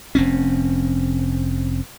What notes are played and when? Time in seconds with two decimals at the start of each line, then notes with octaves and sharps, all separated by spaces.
0.15 F1 C4 C#4